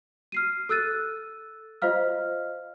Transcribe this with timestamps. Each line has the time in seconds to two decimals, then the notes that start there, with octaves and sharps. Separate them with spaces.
0.32 F6 C7 D#7
0.69 A4 E6 F#6 A6 D#7
1.82 F4 C5 D#5 F5 F6